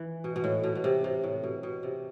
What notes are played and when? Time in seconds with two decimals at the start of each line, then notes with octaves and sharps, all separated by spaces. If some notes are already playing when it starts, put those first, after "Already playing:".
Already playing: E3
0.24 B2
0.36 B2
0.44 A2
0.64 B2
0.75 B2
0.84 C3
1.04 C3
1.23 A2
1.43 B2
1.63 B2
1.83 C3